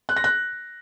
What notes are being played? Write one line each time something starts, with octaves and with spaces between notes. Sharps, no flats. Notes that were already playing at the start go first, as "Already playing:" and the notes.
F#6
A#6
F#6